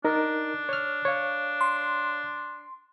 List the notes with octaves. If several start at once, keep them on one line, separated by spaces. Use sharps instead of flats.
D4 D#4 A#4
C#5 F6
C#5 F5
C6